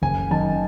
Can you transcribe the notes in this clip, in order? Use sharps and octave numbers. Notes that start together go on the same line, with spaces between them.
F#1 G#5
F#2 D#3 A5